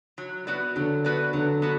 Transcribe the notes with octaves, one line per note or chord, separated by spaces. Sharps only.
F#3
B3 F#4 B4 D5
D3 F#3
B3 F#4 B4 D5
D3 F#3
B3 F#4